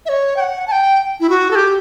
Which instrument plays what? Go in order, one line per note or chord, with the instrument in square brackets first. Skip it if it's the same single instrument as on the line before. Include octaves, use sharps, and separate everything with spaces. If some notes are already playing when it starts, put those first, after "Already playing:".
[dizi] E5
C#5
G5
F#5
A5
G5
E4
F#4
A4
G4